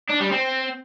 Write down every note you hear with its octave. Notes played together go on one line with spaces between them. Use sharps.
D4
G3
C4